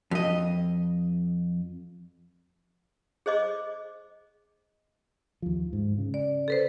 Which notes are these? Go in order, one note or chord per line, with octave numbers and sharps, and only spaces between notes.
F2 D#5
G#4 C5 D#5 D6
D#2 F3
G#2
C#3
D5
A4 B4 C5